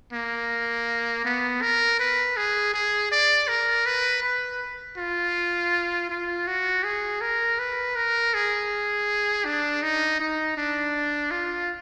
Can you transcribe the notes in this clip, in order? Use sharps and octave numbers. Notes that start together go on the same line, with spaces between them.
A#3
B3
A#4
B4
G#4
G#4
D5
A#4
B4
B4
F4
F4
F#4
G#4
A#4
B4
A#4
G#4
D4
D#4
D#4
D4
F4